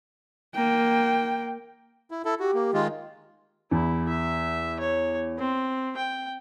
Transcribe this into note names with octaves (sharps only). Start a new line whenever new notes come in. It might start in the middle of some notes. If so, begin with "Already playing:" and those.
A#3 G5
E4
E4 A4
F#4 G4
A#3
D#3 G#3 F4
E2 E4
E5
C#5
C4
G5